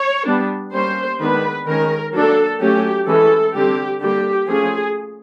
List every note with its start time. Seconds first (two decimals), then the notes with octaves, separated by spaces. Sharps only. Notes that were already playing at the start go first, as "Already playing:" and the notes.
Already playing: C#5
0.27 G3 B3 D4
0.73 G3 A#3 C#4 C5
1.20 D#3 G#3 B3 D4 B4
1.67 D#3 G#3 C#4 A#4
2.14 F#3 A#3 D4 A4
2.61 F#3 A3 C#4 G4
3.07 E3 G#3 C#4 A4
3.54 D3 G3 C4 G4
4.01 D3 G3 A#3 G4
4.48 F3 A3 C#4 G#4